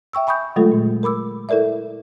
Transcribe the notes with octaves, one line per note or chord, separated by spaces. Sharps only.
E5 G5 C#6 E6
G#5 B5 C#6 D#6 G6
D3 F#3 G#3 A3 F4 A4
A#2
A#4 B5 D6 E6
E4 A4 A#4 D5 E5